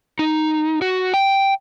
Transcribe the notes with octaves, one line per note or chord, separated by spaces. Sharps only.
D#4
F#4
G5